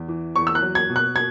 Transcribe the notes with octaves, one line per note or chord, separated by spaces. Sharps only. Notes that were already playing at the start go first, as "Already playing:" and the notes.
Already playing: E2
E3
E2 C#6
E6
F#6
F#3
G#6
B2
F#6
G#6